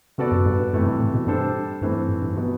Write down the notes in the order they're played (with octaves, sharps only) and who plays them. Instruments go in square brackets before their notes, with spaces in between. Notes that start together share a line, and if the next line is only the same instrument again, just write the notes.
[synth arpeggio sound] C3 [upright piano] B3 F#4 A4 D5
[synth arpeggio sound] F#2
G2
G2
[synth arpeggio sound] F#2 [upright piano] C3 E3 A3
[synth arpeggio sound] G2
A2
B2
[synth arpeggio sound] G2 [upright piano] G3 D4 A4 C5
[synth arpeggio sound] G2 [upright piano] E3 A3 C4
[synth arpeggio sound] G2
G2
G2
[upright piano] B2 F#3 B3